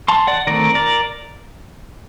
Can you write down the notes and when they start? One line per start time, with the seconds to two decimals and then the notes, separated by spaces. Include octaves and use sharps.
0.08 A5 C6
0.27 D5 F#5
0.47 D#3 A3 C4 A#4 D5
0.75 A#4 D5